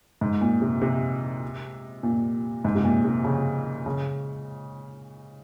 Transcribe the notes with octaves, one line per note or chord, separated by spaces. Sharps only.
G#2
A#2
C3
C3
A#2
G#2
C3
A#2
C3
C#3
C#3